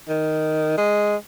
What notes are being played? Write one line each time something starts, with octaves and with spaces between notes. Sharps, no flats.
D#3
G#3